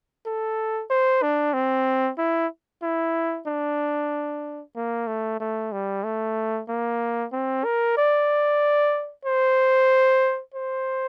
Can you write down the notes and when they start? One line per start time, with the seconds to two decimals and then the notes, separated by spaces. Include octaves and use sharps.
0.26 A4
0.90 C5
1.22 D4
1.54 C4
2.18 E4
2.83 E4
3.47 D4
4.76 A#3
5.07 A3
5.40 A3
5.72 G3
6.04 A3
6.68 A#3
7.32 C4
7.65 A#4
7.97 D5
9.25 C5
10.54 C5